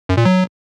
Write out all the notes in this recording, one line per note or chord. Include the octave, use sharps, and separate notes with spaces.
F#2
A#2
F#3